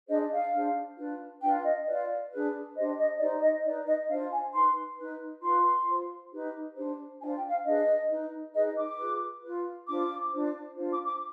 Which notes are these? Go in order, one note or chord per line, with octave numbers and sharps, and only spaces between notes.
D4 G#4 C5 D#5
F5
D4 G#4 C5
D4 F4 B4
D4 F4 B4 G5
D#5
F4 B4 D5
D4 G#4 B4
D4 G4 C5 D#5
D#5
D#4 G4 C5 D5
D#5
D#4 B4 D5
D#5
D4 F4 C5 F5
G#5
D#4 B4 C6
D#4 B4
F4 B4 C6
F4 C5
D#4 G4 B4
D4 G4 C5
D4 F4 C5 G#5
G5
F5
D4 G#4 B4 D#5
D#4 B4
D#4 G#4 B4 D#5
D6
F4 G#4 B4
F4 B4
D4 F4 C5 D6
D4 F4 C5
D4 F4 C5
D6
D6